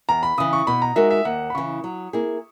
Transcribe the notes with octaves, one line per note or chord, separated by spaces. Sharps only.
E2 A#5
B5
C#3 E3 D#6
C#6
B2 B5
A#5
G#3 D#4 F#4 A#4 E5
E5
D#2 F#5
B5
C#3 E3 C#6
F#3
A#3 E4 G#4